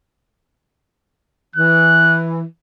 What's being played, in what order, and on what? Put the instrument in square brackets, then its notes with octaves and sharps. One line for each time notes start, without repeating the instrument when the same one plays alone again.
[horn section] E3 [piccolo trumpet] F#6